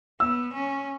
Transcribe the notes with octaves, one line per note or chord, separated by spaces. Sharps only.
B3 E6
C#4